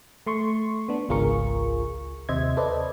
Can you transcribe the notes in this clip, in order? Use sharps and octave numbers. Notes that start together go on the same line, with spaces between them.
A3 C6 C#6
B3 D4
G#1 C#2 F4 G#4 A#4 C#6
D#2 C3 C5 D#5 E5 G#6
A4 B4 C5 D5 D#5